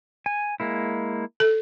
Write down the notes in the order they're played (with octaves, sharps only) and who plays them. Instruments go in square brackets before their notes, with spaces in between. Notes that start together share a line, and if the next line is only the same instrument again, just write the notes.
[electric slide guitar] G#5
G#3 A#3 E4
[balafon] A4